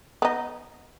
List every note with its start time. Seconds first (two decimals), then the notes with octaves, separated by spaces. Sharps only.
0.22 B3 D#4